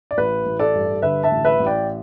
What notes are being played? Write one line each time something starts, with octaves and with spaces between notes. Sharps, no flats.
D5
A1 B4
A1
A4 D5
G2
D3 B4 E5
E5 A5
A1
B4 E5
A1
D5 G5